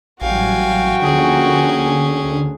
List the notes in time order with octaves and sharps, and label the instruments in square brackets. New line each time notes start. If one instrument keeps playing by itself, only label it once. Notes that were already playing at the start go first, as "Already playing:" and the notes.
[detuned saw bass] A1 [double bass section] F#3 G3 [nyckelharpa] F#4 G5 [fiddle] F5 G#5
[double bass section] D2 F3 A#3 [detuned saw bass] D3 [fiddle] C#4 G#4
[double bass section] D2